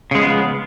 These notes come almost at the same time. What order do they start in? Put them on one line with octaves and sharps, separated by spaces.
C#3 G#3 F3 B3